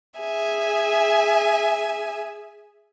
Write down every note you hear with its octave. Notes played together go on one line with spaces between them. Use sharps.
G#4 E5 G#5